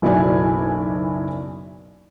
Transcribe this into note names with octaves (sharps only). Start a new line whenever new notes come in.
F#1 B1 E4 F#4 D5 G#5